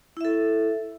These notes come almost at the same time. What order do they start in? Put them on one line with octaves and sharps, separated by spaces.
E4 E5 A4